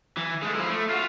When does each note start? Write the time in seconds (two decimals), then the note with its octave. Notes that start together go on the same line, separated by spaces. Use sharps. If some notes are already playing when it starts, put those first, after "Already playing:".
0.17 E3
0.42 G#3 A3
0.55 F3 E4
0.70 A3
0.89 F4 F#4